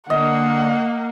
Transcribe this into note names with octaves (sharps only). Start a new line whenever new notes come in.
D3 A#3 D#5 F#5